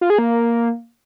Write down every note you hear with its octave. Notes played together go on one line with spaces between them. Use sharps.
F4
G#4
A#3